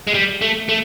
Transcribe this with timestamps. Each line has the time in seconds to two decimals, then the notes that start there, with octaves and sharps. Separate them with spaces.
0.07 G#3
0.14 G3
0.41 A3
0.69 A3